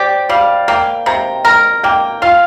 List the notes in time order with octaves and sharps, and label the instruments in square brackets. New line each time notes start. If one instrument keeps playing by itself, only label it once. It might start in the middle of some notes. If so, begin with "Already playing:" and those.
Already playing: [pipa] G4 [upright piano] C5 D5
[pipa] G3 [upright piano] F5
[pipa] A#3 [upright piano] G5
[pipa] C3 [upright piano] A#5
[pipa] A#4 [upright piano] A#5
[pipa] A#3 [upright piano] G5
[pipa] F4 [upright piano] F5